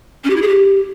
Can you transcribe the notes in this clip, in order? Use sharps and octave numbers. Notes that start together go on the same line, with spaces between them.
C#4
G4
E4
G#4
G4